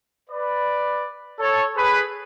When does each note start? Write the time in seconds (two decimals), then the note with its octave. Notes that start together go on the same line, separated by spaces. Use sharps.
0.30 B4 D5
1.39 A4 C#5
1.75 G#4 B4